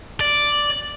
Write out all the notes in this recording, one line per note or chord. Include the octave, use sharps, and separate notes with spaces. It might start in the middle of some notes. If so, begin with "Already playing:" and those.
D5